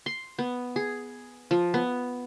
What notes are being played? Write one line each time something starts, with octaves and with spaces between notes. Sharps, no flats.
C6
B3
G#4
F3
B3